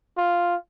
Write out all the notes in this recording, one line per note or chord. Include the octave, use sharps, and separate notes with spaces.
F4